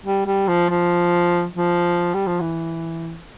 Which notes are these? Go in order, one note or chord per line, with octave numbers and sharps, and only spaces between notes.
G3
G3
F3
F3
F3
G3
F3
E3